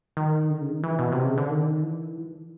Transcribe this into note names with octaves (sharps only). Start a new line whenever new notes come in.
D#3
D3
C#3
D#3
E3
B2
C3
C#3
D3
D#3
E3